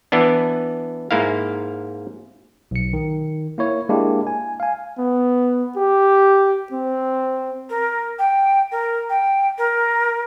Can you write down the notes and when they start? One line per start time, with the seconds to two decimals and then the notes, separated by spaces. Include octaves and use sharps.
0.12 E3 B3 D4
1.11 G#2 A#3 E4 F5
2.71 B1 C#7
2.93 D#3
3.58 A#3 E4 C#5
3.89 G#3 A#3 D4 E4 G4
4.27 G#5
4.60 F5 G#5
4.98 B3
5.77 G4
6.72 C4
7.69 A#4
8.19 G5
8.71 A#4
9.09 G5
9.58 A#4